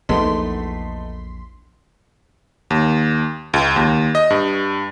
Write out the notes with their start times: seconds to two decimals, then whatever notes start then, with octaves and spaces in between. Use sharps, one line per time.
0.09 A#1 E2 A#2 A3 B3 D#4 C6 B6
2.70 D#2
3.54 C#2
3.76 D#2
4.15 D#5
4.30 G2